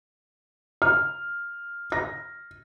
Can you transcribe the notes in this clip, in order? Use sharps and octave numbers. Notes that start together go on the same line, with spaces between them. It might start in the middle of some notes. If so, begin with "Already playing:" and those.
F6
A#6